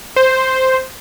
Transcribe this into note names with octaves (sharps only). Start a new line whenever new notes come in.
C5